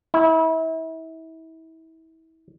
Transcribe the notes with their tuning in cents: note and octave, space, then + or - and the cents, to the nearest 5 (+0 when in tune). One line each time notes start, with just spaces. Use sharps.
E4 -30